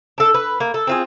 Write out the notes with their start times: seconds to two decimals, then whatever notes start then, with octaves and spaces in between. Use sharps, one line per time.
0.18 D4 A4
0.34 B4
0.60 A#3
0.74 A4
0.87 C4 F4 G#4